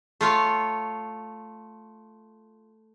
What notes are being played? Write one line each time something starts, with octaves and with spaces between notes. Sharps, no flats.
A3 F4 C#5 F5